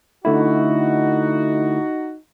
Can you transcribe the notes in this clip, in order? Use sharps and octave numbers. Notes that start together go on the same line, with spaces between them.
D3 A3 D#4 E4 F#4